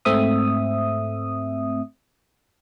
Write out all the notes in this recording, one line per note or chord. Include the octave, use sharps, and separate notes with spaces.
G#2 A3 C4 E5 D#6